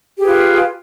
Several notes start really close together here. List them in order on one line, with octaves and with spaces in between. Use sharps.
G4 G#4 B4 F4